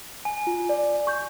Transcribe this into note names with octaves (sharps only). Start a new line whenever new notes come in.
G#5
F4
D5
C#6 G6